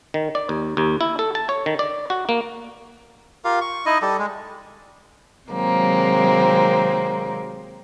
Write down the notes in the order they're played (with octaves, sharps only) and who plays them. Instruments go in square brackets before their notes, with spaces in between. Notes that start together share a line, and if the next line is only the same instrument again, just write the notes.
[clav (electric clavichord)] D#3
D5
D#2
D#2
E4
A4
A5
C#5
D#3
D5
F#4
A#3
[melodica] F4 G4 A#4 F5
C#6
D#4 E4 D#5
G3 G4 A4
G#3
[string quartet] C3 D#3 F#3 G#3 A#3 C4